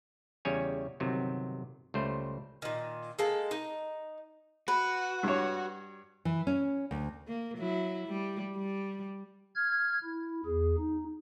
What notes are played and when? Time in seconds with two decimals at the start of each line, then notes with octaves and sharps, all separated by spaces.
0.45 E2 C#3 G3 C#5 G#5
1.00 G1 C3 D#3 F#3
1.94 C#2 G3 A3 C5
2.62 A#2 D#3
3.19 G#3 A#3 A4
3.51 D#4
4.68 F#4 B4
5.23 G2 C#5
6.25 E3
6.47 C#4
6.91 D2
7.27 A#3
7.58 F#3 E4
8.06 G3
8.56 G3
9.55 F6 G#6
10.03 E4
10.45 E2 G#4
10.78 D#4